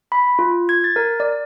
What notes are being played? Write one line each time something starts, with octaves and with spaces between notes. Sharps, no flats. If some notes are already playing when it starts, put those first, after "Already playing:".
B5
F4
G#6
A6
A#4
D5